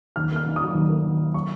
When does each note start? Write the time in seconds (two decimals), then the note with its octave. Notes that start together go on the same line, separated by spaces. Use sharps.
0.16 D#2 F6
0.32 A#3 F6
0.46 D#3
0.56 F#3 D#6
0.75 D#2
0.89 A#3
1.04 D#3
1.20 F#3
1.34 C#6